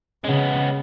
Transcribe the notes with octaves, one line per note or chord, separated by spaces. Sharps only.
C#3 G#3 B3